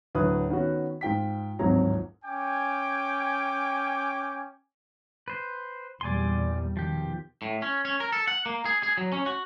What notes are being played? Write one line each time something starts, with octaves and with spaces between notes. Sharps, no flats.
D2 A2 F#3 B4 D#6
D#3 B3 C#4 F#4
G#2 F4 G5 B6
D1 G#1 G#2 F3 F#3 A#5
C#4 G5 G#5 D6
B4 C5
E2 A#2 G3 D5 G#5 C6
B2 D#3 F3 G4
A2
C#4
C#4
A#4
A4
F#5
A#3
G#4
G#4
F#3
C#4
F#4